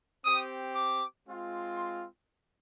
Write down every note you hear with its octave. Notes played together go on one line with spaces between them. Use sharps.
C4 G4 D#6
D6
G#3 C4 F4
C6